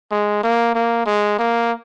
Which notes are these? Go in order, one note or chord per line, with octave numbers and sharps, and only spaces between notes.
G#3
A#3
A#3
G#3
A#3